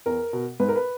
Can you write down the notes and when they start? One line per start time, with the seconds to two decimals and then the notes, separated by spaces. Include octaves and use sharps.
0.06 E2 A#4
0.33 B2
0.60 G#2 B4
0.69 A#4
0.76 B4